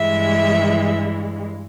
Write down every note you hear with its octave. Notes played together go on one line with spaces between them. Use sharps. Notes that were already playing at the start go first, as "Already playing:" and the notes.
Already playing: G2 E3 G#3 E5